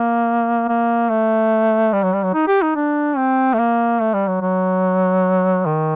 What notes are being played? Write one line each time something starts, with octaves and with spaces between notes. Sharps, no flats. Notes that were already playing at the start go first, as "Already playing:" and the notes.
Already playing: A#3
A#3
A3
G3
F#3
G3
F#3
D#4
G4
D#4
D4
C4
A3
A#3
A3
G3
F#3
F#3
D#3